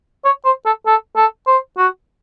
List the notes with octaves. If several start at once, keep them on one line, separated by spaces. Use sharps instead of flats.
C#5
C5
A4
A4
A4
C5
F#4